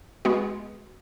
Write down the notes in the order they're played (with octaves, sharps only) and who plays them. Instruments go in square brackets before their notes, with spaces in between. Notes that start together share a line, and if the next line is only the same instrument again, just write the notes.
[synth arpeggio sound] G#3 B3 F#4